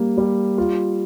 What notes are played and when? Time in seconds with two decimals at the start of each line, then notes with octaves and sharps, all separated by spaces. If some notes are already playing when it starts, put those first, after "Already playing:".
Already playing: G3 A#3
0.18 G3
0.58 F4